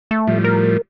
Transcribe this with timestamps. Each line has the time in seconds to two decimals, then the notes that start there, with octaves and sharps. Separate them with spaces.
0.11 A3
0.27 A2 F3 G3
0.44 A#4